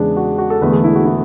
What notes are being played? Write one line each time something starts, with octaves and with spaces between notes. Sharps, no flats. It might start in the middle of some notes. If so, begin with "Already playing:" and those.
Already playing: E2 C#3 G#3 D4
F#4
F#4
A4
E1 E2 D3 A3 B4
G#4
E4
F#4
E4